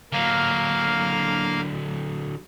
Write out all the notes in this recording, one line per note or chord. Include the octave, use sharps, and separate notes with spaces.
D3 F#3 A#3 F5